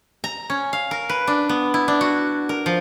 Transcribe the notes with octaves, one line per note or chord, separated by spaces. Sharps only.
A#5
C#4
F5
A#4
B4
D4
B3
E4
D4
F#4
A#4
F3